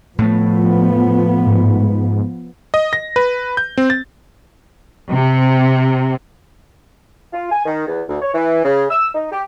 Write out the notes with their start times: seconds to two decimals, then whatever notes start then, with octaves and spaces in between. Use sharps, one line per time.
0.19 A2 F3 A3 B3
1.46 G#2
2.74 D#5
2.93 A#6
3.16 B4
3.57 G6
3.78 C4
3.90 A6
5.11 C3
7.33 F4
7.52 G#5
7.66 D#3
7.87 E2
8.09 D2
8.22 C#5
8.34 E3
8.65 C#3
8.91 E6
9.15 D#4
9.32 G4